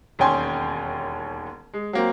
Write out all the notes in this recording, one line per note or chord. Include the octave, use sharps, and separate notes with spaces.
E1 D#2 C#4 G5 G#5 C6
G#3
F#3 A#3 C4